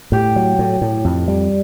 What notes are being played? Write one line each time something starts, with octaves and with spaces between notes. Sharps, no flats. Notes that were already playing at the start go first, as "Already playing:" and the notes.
A2 G4
F#3
A2
A2
F2
G3